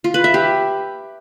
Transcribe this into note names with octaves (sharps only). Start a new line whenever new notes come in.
F4
B4
E5
G4